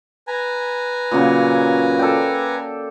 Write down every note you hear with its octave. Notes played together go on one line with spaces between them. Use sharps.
B4 G#5 A#5
A#2 C#3 F#3
A4 D5 G5